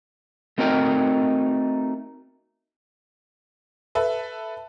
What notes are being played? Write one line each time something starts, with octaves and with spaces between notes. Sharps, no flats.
A3 C4 D#4 F#4 A#4 G5
A4 B4 E5